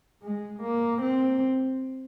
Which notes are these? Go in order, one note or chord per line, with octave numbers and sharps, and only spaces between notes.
G#3
A#3
C4